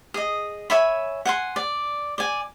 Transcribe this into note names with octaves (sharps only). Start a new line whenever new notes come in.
G#4 D#5
C#5 E5 G#5 B5
F#5 G#5 C6
D5
D5 G#5